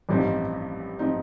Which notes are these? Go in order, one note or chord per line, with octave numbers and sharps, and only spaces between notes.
A1 G2 F3 C4 D#4
F3 C4 D#4